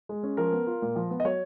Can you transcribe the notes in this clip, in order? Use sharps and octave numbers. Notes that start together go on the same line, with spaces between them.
G#3
C#4
F3 A#4
B3
F4
A#2
F3
B3
D#5
F#3 C#5